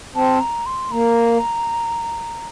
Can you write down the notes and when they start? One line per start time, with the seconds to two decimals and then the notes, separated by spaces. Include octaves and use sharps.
0.16 C4 A5
0.41 A#5
0.66 C6
0.92 A#3 A#5